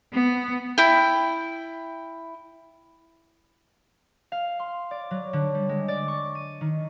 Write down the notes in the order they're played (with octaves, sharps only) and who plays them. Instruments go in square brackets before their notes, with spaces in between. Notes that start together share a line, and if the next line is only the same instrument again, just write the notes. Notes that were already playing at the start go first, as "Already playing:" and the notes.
[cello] B3
[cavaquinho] E4 G5
[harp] F5
C6
D5
F#3
D3
G3
G#3
D5
C#6
D#7
D#3